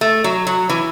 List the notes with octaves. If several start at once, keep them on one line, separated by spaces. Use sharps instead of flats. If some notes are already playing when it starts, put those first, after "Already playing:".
A3
F#3
F#3
E3